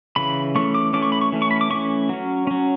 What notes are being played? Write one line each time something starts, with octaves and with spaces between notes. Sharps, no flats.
C#3 E3 B5
E3 A3 C#4 C#6
D6
E3 A3 C#4 D6
C#6
B5
C#6
E3 A3 C#4
C#6
B5
D6
E3 A3 C#4 C#6
F#3 C#4
F#3 C#4